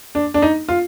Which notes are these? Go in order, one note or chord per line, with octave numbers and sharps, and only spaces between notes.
D4
D4
D#4
F4